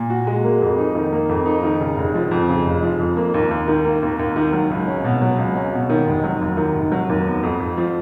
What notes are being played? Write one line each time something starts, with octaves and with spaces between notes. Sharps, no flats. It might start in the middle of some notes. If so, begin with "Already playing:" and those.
Already playing: A#2
F#4
G#3
A#3
F2
D#4
D#3
A#3
F2
D#4
D#3
C#3
F1
F3
F2
C#3
F1
F3
F2
A#3
D#2
D#2
D#3
A#3
D#2
D#2
D#3
F#3
C#2
C#4
B2
F#3
C#2
C#4
B2
D#3
F1
F#3
D#2
D#3
F1
F#3
D#2
B3
F2
F2
F3